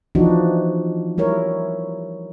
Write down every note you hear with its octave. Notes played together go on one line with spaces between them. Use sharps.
E3 F3 D4 D#4 F#4
G3 E4 A#4 C#5